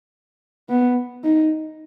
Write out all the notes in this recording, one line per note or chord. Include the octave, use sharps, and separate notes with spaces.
B3
D#4